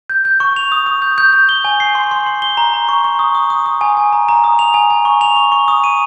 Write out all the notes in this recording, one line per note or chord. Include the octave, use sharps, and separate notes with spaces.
G6
G6
C#6
F7
D#6
D#6
G6
G6
G6
G7
G#5
C7
C6
C6
C6
G7
A#5
A#5
C#6
C#6
D#6
D#6
D#6
D#6
G#5
G#5
A#5
A#5
D#6
F7
G#5
G#5
C#6
F7
C#6
C#6
D#6
D#7